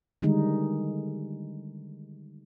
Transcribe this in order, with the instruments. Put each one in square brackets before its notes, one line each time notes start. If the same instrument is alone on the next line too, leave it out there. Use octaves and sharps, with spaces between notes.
[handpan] D3 D#3 G3 G#3 D#4